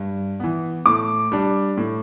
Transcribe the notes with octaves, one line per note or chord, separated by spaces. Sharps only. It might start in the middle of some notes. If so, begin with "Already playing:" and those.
Already playing: G2
E3 B3
A2 D6
G3 D4
A2